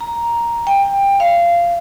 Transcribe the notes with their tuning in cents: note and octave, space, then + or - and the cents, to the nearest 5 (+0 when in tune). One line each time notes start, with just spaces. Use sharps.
A#5 +5
G5 +20
F5 -20